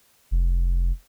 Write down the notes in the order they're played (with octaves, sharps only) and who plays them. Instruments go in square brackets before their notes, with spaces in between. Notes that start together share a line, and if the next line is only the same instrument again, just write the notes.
[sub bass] F1